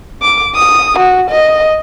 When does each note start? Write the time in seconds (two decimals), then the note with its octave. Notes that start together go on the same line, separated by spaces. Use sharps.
0.22 D6
0.55 D#6
0.99 F#4
1.30 D#5